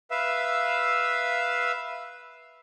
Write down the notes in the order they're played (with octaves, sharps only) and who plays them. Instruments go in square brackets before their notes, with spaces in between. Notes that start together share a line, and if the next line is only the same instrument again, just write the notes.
[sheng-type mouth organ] B4 E5 F5 E6